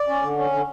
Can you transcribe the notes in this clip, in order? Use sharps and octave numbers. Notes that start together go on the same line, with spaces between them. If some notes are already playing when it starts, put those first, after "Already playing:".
Already playing: D5
C#4
D3
C#4
D3